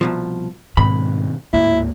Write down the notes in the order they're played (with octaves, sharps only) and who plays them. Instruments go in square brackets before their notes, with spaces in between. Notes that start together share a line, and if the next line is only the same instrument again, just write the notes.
[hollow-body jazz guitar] C2 B2 F3
[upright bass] G#2 [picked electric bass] B2 D#3 C4 [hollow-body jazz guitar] B5
[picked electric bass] D1 G#2 A#3 [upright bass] D2 [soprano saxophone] E4